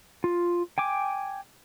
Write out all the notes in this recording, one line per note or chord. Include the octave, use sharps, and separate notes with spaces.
F4
G5 G#5 D6